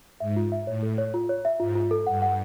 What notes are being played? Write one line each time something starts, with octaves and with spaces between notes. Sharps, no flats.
G#2 E5
F4
E5
A2 C#5
A4
C#5
F4
C#5
E5
G#2 F4
F4
A4
G2 F#5
F#5